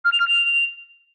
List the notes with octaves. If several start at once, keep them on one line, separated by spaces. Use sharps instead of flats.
F6
F7
F6
F7